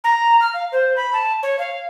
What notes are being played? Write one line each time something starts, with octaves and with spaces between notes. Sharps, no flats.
A#5
F6
F5
C5
B5
A5
C#5
F5